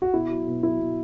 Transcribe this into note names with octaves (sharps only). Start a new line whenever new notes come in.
F#4
B2 E4
F#3
B2
F#3 E4
B2